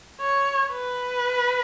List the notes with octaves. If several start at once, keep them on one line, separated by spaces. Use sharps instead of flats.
C#5
B4